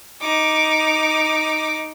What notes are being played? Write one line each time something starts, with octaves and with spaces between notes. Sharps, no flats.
D#4 D6